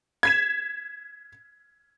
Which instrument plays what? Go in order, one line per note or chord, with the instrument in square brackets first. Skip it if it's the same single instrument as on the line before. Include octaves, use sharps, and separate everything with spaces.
[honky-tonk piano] G#6 B6 E7